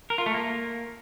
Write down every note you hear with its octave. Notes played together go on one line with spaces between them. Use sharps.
A#4
F4
A3
A#3